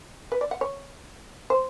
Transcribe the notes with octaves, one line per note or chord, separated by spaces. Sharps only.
B4
D5
F#5
C#5
C5